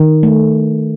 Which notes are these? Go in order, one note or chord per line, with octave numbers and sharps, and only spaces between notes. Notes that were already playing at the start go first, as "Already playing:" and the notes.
Already playing: D#3
A3